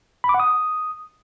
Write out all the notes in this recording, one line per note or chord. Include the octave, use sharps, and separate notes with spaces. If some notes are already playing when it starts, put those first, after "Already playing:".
B5
D6
F#5
D#6